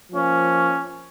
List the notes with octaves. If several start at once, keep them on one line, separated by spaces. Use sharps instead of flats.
F3 A#3 C#4